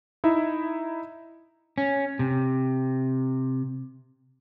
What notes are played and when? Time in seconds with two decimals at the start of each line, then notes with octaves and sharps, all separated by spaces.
0.24 D#4 E4 E5
1.78 C#4
2.19 C3